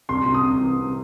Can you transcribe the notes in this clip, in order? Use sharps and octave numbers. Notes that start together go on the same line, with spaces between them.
C2 C6
C3
D#6
C2
E3
C3